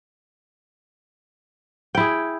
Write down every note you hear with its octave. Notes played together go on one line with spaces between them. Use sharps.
E4 G#4 G5